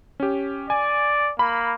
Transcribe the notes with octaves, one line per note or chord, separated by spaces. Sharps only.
C#4 G4
D5 G#5
A#3 B5